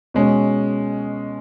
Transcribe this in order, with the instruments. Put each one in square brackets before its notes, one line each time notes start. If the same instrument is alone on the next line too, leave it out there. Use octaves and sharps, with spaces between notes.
[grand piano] B2 G#3 C#4